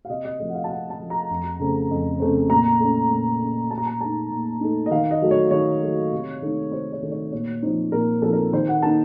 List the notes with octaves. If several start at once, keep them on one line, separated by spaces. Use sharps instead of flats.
F5
C3 D#5
D#5
F3 A3 D#5
F#5
F5
A5
C3 F#5
A5
F3 A3
A#5
F2
C#3 A3 C4
F2
C#3 A3 C4
A#2 A#5
A3 C#4
A#2
A3 C#4
A#2 A5
A#5
A5
A3 D#4 A5
A#2
A3 D#4
D#5
D#3 F5
D#5
F#3 A3
C#5
D#3 C#5
F#3 A3
C3
D#3 A3 D#4
C3 C5
C#5
D#3 A3 D#4
C#5
A#2 C#5
F3 C4 D#4 C5
A#2 A#4
F3 C4 D#4 A4
A#4
D#3 C5
F#5
A#3 D#4 A5